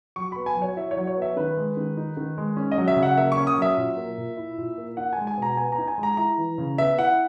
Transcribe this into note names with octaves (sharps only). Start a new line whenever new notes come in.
F#3 C#6
B3 B5
G#5
F#3 C#5
E4 E5
C#5
F#3
C#5
B3
E5
D#3 B4
G#3
D#3
D#4
D#3
G#3
C#4
D#5
F#3
E5
C#3
F#5
A#3 E5
C#6
C#4
D#6
F#3 E5
A#2
A#3
A#2
E4
A#2
A#3
D#4 F#5
G#5
G#3
G#5
B2 A#5
B3 G#5
A#5
D#4
G#5
G#3
A#5
E4 A#5
E3
C#3
B3 E5
E4 F#5